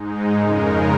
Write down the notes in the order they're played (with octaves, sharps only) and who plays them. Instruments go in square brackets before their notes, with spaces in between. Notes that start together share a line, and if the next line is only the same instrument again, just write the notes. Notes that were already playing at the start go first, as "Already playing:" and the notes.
Already playing: [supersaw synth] G#2 G#3 D#4
F2 C#3 G#3 D#4 A#4